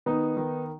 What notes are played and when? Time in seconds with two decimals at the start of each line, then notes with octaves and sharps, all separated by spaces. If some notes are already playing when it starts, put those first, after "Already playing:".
0.06 D#3 B3 D#4
0.37 D#3